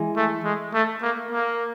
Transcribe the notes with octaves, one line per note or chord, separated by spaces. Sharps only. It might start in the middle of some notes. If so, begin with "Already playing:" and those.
Already playing: E3 G#3
A3
G#3
A3
A#3
A#3